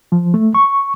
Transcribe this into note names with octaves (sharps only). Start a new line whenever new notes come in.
F3
A3
C#6